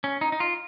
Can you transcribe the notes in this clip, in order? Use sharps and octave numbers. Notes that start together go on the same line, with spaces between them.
C#4
D#4
D#4
F4